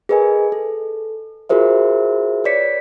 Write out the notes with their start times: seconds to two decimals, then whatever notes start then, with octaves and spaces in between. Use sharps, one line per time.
0.09 G#4 A#4 B4 D#5 G#5
0.52 A4
1.49 F4 F#4 G#4 A#4 C5 E5
2.44 B4 C#5 D5 B6 C#7